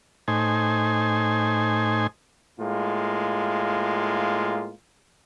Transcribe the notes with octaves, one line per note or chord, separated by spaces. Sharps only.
A2 D#4 C5 G#5
A2 G#3 A#3 F4